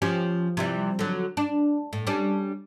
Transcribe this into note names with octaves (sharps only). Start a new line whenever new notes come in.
F3 C#4 G4
C3 E3 G3
D3 F#3
D4
A2
G3 C#4 D4